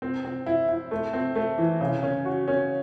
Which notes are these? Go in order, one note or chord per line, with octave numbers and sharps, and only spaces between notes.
C4
C4
E4
E4
A3
C4
A3
E3
C#3
C#4
F#4
C#4